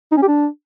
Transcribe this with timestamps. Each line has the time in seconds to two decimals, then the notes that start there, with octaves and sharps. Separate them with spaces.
0.12 D#4
0.17 C#4
0.22 G4
0.28 D4